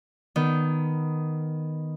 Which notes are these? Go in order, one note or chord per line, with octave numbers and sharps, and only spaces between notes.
D#3 B3